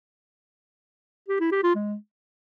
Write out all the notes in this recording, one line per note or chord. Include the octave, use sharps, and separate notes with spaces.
G4
E4
G4
F4
G#3